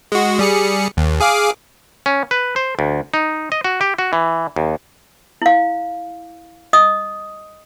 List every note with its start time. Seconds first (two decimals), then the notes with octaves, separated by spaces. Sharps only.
0.12 G#3 F#4
0.39 G3 G#4 C#7
0.97 D#2
1.20 G#4 F5 D6
2.06 C#4
2.31 B4
2.56 C5
2.79 D2
3.14 D#4
3.52 D#5
3.64 F#4
3.81 G4
3.99 F#4
4.13 E3
4.56 D#2
5.42 E4 F5
6.73 D#5 D#6